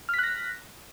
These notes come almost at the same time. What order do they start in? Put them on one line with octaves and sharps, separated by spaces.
F6 B6 F#6 A#6